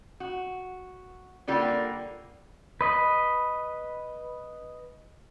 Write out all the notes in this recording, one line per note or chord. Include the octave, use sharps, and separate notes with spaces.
F#4
D3 G3 A#3 F4 G4
B4 D#5 B5